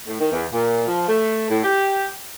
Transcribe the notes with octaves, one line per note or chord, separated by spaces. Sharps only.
A2
D#3
E2
A#2
F3
A3
A2
G4